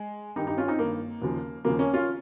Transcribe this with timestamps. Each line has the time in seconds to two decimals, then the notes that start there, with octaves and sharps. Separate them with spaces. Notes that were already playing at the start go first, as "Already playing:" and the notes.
Already playing: G#3
0.36 G2 D#3 D#4 G4
0.47 D#4 G4
0.57 C#4 F4
0.68 C4 D#4
0.79 G2 D#3 A#3
1.22 D#2 C#3 F3
1.65 D#2 C#3 F3 A#3
1.79 A#3 C#4
1.93 C#4 F4